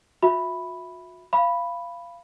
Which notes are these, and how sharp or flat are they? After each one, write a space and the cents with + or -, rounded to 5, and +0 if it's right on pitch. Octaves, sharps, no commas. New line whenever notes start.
F#4 -45 E5 +0 B5 +0
F5 -20 B5 +0